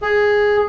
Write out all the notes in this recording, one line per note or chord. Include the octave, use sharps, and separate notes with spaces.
G#4